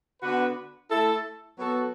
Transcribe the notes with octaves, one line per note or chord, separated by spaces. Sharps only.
D3 B3 D4 F#4 B4
A3 E4 A4
F#3 B3 F#4 A4